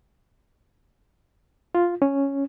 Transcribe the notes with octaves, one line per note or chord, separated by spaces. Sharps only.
F4
C#4